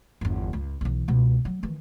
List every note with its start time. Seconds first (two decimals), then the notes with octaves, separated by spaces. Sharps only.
0.21 G1 E2
0.53 C#2
0.81 B1 E3
1.08 C#2 B2
1.45 F#3
1.63 D#3 E3